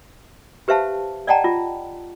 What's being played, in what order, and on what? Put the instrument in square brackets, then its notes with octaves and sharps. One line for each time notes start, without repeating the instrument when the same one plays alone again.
[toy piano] G4 B4 C5 E5 F5 A5
D5 D#5 F#5 G5 A5 A#5
F4